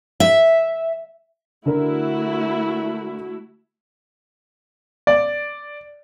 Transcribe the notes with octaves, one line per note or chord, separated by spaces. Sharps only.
E5
D3 A3 D4 E4 F#4 A#4
D5